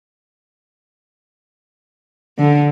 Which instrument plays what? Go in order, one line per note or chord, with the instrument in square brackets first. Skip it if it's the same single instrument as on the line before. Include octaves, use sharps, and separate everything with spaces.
[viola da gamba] D3